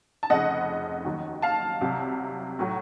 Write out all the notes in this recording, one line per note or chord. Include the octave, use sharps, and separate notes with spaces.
A5
F1 F2 C#3 F3 D#5 F#5
D#2 D#3 F#3
F5 A5
C2 C3 F#3
A2 F#3